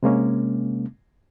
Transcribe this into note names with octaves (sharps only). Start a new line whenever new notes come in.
C3 G#3 A#3 C#4